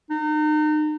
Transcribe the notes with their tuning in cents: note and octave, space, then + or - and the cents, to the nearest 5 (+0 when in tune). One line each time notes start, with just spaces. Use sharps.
D#4 -35